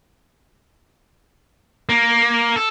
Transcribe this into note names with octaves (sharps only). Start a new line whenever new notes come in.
A#3
A4